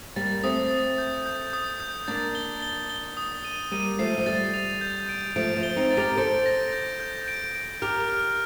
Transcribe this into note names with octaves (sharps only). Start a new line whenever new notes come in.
G3 A#3 A6
A3 C4 D#6
D#6
G6
G6
D#6
G6
A#3 D4 A6
G7
G7
G7
D#6
D#7
G3 A#3 D#7
F3 A3 C7
F3
G3 A6
F7
G6
D7
F3 A3 D7
F3
G7
C4 D#4
A6
G4 A#4
A4 C5 D7
A#6
G6
G6
D7
D7
G4 A#4 F6
F6